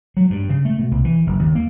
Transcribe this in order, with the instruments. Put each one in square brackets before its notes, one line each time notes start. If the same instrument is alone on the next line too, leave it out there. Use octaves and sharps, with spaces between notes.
[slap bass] F#3
G2
C#3
A3
B2
C2
E3
F#1
D#2
A#3